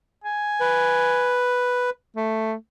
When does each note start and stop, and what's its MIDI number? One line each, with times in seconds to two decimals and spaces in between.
0.24 1.45 80
0.60 1.90 71
2.17 2.55 57